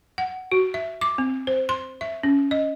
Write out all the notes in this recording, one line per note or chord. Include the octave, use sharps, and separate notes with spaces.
F#5
F#4
E5
D6
C4
C5
C6
E5
C#4
D#5